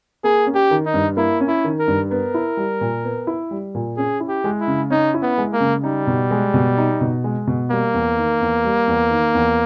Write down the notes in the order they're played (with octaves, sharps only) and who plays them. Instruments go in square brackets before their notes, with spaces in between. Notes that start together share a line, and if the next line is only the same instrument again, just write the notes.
[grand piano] A#3 [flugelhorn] G#4
[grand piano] C#4
[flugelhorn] G4
[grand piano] D#3
[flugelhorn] D#4
[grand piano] G2
[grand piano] A#3 [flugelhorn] E4
[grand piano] C#4
[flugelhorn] E4
[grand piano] D#3
[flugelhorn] A#4
[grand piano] G2
[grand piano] B3 [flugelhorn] A#4
[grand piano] E4
G3
A#2
B3
E4
G3
A#2
[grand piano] C#4 [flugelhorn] G#4
[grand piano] E4
[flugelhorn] G4
[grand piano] G#3
[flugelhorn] E4
[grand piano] C#3
[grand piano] C#4 [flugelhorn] D#4
[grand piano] E4
[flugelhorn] B3
[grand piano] G#3
[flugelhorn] A#3
[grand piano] C#3
[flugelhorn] G3 [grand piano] D#4
[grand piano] B2
G#3
B2
D#4
B2
G#3
B2
[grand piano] G3 [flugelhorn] A#3
[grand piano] E2
D#3
E2
G3
E2
D#3
E2